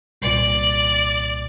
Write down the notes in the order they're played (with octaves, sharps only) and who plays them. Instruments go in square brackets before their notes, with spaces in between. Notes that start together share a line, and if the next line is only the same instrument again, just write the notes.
[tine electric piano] C2 A#2 [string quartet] D5